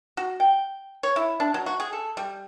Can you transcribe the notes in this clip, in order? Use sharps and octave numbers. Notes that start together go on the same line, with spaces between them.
F#4
G5
C#5
E4
D4
F#3
F#4
G#4
A4
G3